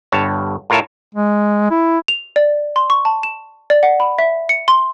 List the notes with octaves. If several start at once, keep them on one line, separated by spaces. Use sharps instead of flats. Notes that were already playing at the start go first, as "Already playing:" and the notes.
G1 G2 C#5 A5
A2 F4 A#4 C#5 E5 A5
G#3
E4
F7
D5
C6
C#6
A5
E7
D5
F#5
B5
E5
C#7
C6